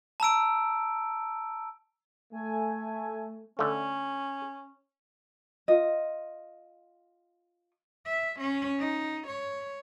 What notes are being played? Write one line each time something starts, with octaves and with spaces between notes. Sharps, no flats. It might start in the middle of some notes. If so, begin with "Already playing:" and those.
A5 A#5 E6 D7
A3 G#5
D3 A3 C#4
F4 D#5
E5
C#4
D#4
C#5